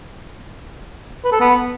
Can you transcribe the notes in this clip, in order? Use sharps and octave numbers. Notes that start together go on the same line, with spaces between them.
B4
A4
B3